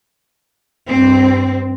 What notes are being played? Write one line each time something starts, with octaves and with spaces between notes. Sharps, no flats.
G2 C4